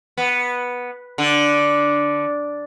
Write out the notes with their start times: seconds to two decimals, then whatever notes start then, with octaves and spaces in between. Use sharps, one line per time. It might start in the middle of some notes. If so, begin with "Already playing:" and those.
0.18 B3
1.18 D3